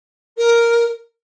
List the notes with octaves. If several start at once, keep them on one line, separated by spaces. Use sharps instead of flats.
A#4